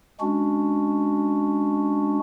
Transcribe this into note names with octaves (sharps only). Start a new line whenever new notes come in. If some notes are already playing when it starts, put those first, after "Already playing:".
G#3 C#4 D4 F#4